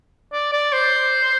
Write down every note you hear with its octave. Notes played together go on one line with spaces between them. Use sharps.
D5
D5
C5